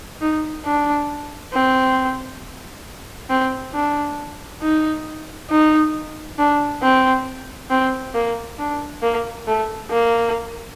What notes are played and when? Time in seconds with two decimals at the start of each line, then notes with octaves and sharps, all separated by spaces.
0.21 D#4
0.65 D4
1.53 C4
3.30 C4
3.74 D4
4.62 D#4
5.50 D#4
6.38 D4
6.82 C4
7.70 C4
8.15 A#3
8.58 D4
9.02 A#3
9.47 A3
9.91 A#3